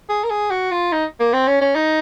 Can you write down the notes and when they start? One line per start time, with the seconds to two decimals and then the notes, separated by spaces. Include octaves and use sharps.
0.09 G#4
0.24 A#4
0.30 G#4
0.51 F#4
0.72 F4
0.92 D#4
1.20 A#3
1.33 C4
1.48 C#4
1.61 C#4
1.76 D#4